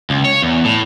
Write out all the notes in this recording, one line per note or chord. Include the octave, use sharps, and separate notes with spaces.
C#2
C#5
E2
A2